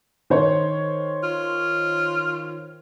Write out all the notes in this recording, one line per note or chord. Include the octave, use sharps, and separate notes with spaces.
D#3 C5 C#5
F4